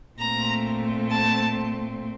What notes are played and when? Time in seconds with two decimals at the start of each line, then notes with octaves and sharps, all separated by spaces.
0.19 A#2 A3 C4 A#5
1.13 A5